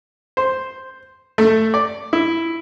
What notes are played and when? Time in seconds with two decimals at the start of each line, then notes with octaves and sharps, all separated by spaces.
0.37 C5
1.38 A3
1.74 D5
2.13 E4